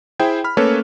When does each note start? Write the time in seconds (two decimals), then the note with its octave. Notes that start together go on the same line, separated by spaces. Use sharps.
0.20 E4 G#4 C5 E5 G5
0.44 B5 F6
0.57 A3 A#3 C#4 A4 B4 C#5